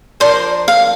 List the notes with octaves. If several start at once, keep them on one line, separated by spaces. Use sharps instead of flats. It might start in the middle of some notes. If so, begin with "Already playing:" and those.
F3 D4 A#4 C5 D5
F5